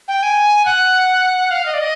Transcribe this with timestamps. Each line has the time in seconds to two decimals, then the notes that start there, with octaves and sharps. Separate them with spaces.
0.08 G5
0.23 G#5
0.65 F#5
1.51 F5
1.66 D#5
1.74 D5
1.80 D#5